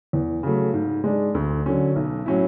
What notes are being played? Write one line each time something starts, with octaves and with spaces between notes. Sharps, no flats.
E2
C#3 F#3 A3
G#2
G#3 D4
D2
D3 F#3 C#4
B1
A2 F#3 C#4 E4